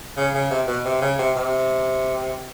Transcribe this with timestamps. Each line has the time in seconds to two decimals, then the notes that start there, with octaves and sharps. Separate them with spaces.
0.17 C#3
0.34 C#3
0.50 C3
0.67 B2
0.85 C3
1.01 C#3
1.19 C3
1.36 C3